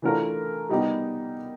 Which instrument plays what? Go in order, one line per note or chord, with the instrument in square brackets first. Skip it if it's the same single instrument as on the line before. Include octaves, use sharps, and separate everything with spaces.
[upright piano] E3 A3 D4 F4 A#4
G3 B3 D#4 G4